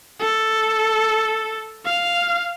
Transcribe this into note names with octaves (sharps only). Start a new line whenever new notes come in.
A4
F5